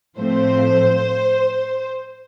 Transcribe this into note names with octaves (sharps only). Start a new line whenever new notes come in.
A2 F3 A3 C4 C5